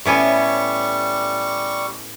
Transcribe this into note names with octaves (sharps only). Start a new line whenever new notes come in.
A2 G3 B3 C#4 C#6